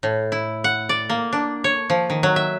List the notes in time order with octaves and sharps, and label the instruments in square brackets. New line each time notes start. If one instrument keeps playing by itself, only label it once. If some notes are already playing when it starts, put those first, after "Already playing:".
[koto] A2
E4
F#5
D5
A#3
D4
C#5
F3
D#3
F#3
E5